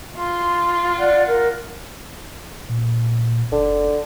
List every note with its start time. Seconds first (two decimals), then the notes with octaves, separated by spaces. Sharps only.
0.17 F4 C6
0.99 D5 F#5
1.28 A#4
2.69 A#2
3.52 F#1 D3